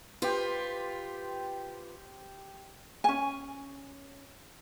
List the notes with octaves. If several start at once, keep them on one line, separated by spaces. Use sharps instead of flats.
F4 G4 B4 C5
C#4 G#5